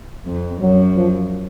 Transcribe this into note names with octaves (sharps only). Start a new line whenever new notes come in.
F2
F#2 F#3
F3